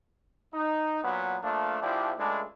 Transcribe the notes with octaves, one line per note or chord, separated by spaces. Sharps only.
D#4
A#2 F#3 B3
F3 A3 A#3 D4
A#1 F3 D4 E4 G4
C#2 G#3 A3 D4 B4